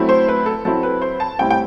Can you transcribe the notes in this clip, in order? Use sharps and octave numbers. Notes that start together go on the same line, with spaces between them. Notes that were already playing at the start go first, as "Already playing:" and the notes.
Already playing: F#3 A3 C4 E4
C5
B4
A4
F#3 C4 E4 A4
B4
C5
A5
A2 G3 C4 E4 G5
G5